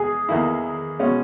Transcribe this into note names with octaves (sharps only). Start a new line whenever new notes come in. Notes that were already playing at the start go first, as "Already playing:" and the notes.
Already playing: E2 G#3 G#4
E2 D#3 A#3 E4
B2 G#3 C#4